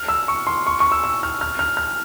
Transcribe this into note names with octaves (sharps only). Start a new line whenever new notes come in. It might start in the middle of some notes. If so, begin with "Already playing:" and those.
Already playing: F6
E6
C#6
C6
C#6
C#6
E6
E6
F6
F6
F6
F6